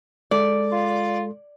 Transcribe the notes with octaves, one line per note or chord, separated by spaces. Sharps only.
G#3 A4 D5
F4